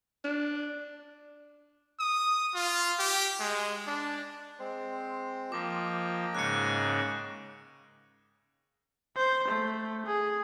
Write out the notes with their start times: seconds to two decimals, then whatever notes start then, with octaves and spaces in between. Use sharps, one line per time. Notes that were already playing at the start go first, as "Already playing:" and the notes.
0.24 D4
2.00 D#6
2.54 F4
2.99 G4
3.40 G#3
3.87 D4
4.59 G#3 C4 C5
5.52 F3 A#3 D#5 G5 D6
6.35 G#2 C#3 F#6 C#7
9.17 C5
9.48 A3
10.06 G#4